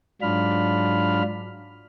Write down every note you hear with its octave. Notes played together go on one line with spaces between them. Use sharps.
G#2 F#3 D4 F4 B5 F6